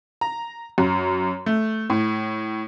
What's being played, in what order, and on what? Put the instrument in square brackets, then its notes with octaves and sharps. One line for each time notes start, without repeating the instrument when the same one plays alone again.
[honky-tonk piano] A#5
F#2
A3
A2